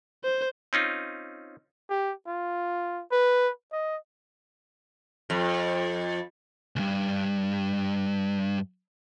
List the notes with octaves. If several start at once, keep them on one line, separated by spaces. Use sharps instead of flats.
C5
C4 C#4 D#4 F4
G4
F4
B4
D#5
F2
C#2 G2